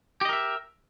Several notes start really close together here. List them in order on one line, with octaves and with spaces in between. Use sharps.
G4 D#5 A#4 E5